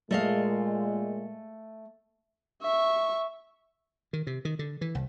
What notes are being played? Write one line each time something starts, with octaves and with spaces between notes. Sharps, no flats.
A#2 G#3 A3 D#5 F5
E5 C#6
D#3
C3
D#3
D3
E3
C2